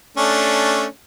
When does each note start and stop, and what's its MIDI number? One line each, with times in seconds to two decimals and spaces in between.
0.17 0.85 57
0.17 0.85 61
0.17 0.85 62